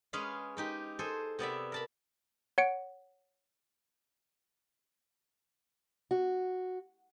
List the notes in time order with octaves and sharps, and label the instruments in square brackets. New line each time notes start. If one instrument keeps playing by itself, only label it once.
[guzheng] G#3 C#4 G#4 B4 F5
G#3 D#4 G4
G#4 A4 C5 G#5
C3 B3 D5 E5
A#4 A5 B5
[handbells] C#5 F#5 C#7 D7
[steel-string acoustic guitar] F#4